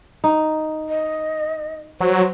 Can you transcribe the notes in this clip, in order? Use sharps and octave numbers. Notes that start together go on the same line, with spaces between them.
D#4
D#5
F#3 C5